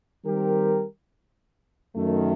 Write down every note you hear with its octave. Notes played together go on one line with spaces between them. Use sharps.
D#3 G3 C4 G4 A#4
F#2 D#3 A3